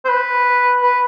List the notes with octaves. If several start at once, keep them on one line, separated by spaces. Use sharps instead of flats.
C5
B4
B4